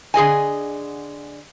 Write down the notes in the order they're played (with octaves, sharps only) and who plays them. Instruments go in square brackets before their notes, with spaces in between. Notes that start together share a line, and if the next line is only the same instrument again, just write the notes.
[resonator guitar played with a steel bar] D3 G#4 D#5 G#5